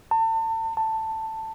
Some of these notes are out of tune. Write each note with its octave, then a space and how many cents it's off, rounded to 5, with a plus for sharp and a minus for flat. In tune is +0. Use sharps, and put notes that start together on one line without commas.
A5 +35
A5 +10